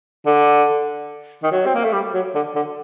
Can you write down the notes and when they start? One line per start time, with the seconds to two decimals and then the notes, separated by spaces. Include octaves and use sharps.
0.26 D3
1.43 D#3
1.52 F#3
1.66 C4
1.75 A#3
1.84 A3
1.93 G3
2.14 F#3
2.35 D3
2.55 D3